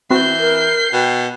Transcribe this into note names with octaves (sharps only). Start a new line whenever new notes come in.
E3 C4 F#4 G6 C7
A#4
B2 G5